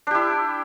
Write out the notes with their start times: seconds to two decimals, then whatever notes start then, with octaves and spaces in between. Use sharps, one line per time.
0.07 D4
0.11 G4
0.15 E4